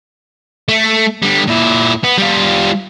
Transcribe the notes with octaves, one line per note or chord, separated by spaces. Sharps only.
A3
D3 G3
A#2 E4
B3
G3 F4